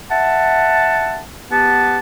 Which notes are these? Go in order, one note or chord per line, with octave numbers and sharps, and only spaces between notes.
E5 F#5 A5
B3 G4 B4 F#5 A5